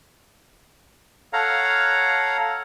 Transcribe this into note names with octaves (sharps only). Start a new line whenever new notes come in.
A4 C#5 F5 F#5 A#5